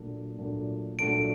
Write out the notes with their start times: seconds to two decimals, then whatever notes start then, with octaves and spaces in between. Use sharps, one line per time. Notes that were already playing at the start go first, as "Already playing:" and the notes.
Already playing: A#2 F#3 A3 D4
0.38 A#2 F#3 A3 D4
0.99 A#2 F#3 A3 D4 D7